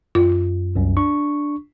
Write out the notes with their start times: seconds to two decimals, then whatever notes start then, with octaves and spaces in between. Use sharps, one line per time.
0.15 F#2 F4
0.75 C2 F#2
0.97 D4 C#6